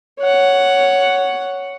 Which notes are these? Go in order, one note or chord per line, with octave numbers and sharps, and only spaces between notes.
C#5 F#5